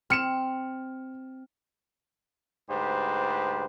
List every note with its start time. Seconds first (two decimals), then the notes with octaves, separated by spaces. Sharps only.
0.10 C4 F6 C#7 E7
2.69 D2 G#2 G4 B4 C5